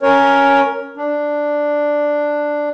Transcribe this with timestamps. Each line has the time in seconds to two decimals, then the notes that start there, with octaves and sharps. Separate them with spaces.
0.03 C#4 A#4 C#5
0.97 D4